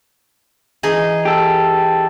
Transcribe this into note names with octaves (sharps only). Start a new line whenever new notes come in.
E3 D#4 G#4
G4 A4